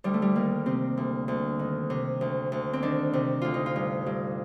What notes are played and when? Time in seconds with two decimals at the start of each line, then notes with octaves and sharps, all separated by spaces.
0.04 D2 G3
0.14 A3
0.22 G3
0.35 D#3 A#3
0.66 C3 C4
0.97 D2
1.28 D2
1.59 D#3
1.90 C3
2.21 D2
2.52 D2
2.73 C4
2.82 D#3 D4
3.13 C3
3.41 D2 F4
3.54 D#4
3.66 F4
3.76 G2
4.06 G2